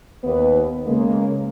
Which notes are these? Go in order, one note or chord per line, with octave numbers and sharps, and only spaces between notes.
D#2 B3 B4
C#3 G#3 A#3